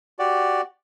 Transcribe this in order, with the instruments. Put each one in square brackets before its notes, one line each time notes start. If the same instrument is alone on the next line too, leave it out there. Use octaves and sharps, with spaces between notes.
[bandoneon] F#4 G4 D5